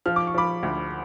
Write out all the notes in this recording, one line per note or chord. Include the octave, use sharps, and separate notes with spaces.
F3 F6
D6
C#6
F3 B5 D6
D2